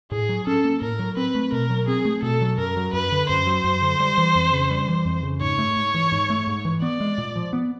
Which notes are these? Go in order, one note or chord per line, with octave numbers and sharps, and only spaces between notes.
A2 G#4
F#3
C#4 A4
A#3
A2 A#4
F#3
C4 B4
A3
B2 A#4
F#3
C4 G#4
A3
B2 A4
F#3
F#2 A#4
F#3
F#2 B4
D3
F#2 C5
F#3
F#2
D3
G3
E3
F2
C#3
G3
E3
F2
C#3
G#2 C#5
A3
G#2
E3
G#2
A3
G#2
E3
B3 D5
G#3
A#2
F3
B3